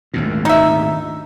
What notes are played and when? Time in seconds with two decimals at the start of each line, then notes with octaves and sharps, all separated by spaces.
0.14 G#1 D2 A#2
0.45 D#4 E5